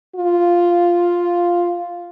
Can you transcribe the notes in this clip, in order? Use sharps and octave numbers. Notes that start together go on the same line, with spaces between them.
F4